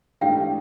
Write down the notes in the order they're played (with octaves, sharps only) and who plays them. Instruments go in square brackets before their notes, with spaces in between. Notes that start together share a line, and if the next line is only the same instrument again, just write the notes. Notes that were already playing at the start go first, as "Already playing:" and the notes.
[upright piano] G#2 E3 A3 D4 G4 [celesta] F5 G5